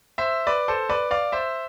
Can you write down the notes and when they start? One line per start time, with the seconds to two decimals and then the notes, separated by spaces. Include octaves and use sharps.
0.18 C5 E5
0.47 B4 D5
0.68 A4 C5
0.90 B4 D5
1.11 D5 F5
1.32 C5 E5